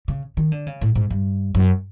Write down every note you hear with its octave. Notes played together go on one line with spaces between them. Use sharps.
C#3
D#3
D3
C#3
A2
G#2
G2
F#2